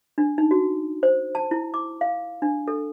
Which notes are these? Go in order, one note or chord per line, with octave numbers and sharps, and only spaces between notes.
D4
D#4
F#4
C5
A5
E4
D6
F5
D4
A4